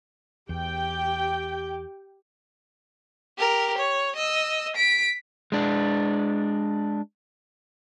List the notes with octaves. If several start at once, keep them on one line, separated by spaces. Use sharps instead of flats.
E2 G4 G5
G4 A#4
C#5
D#5 E6
B6 D7
G#3 D4